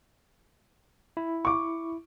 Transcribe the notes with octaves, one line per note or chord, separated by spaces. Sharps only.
E4
C#6 D6